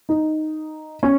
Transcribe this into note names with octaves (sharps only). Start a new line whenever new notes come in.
D#4
C#4